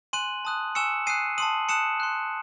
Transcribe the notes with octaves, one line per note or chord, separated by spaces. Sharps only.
G#5 C6 F#6 D#7 F#7
A5 D#6 F#6
G#5 C#6 E6 C#7 E7
G#5 D#6 F#6 C7 D#7
A5 C6 D#6 D#7 F#7
A5 D#6 F#6 C#7 E7
C6 F#6